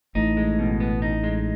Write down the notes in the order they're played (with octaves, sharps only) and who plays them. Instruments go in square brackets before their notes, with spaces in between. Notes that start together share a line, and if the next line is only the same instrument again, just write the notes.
[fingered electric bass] A1 A2 [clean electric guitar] D#4
[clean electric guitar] G#3
B2
B3
D#4
G#3